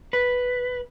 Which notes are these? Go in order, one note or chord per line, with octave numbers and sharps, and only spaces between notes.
B4